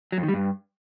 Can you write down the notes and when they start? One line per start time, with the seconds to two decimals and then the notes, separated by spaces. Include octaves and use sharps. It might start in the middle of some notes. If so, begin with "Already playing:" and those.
0.12 F#3
0.18 F2
0.23 D#3
0.28 G3
0.34 G2